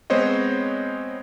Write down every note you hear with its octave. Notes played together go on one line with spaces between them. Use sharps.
G#3 B3 C4 C5 C#5 D#5